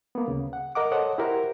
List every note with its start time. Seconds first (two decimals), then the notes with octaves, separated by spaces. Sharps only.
0.15 A#3 B3
0.28 D2 C#3
0.53 F#5
0.75 A#4 D#5 F#5 D6
0.91 A4 C5 C#5 D#5 F#5
1.18 E4 G4 A#4 C5 F#5